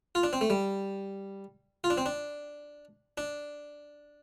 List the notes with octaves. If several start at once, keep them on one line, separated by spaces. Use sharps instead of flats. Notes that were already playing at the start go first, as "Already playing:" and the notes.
F4
D4
C4
A3
G3
F4
D4
C4
D4
D4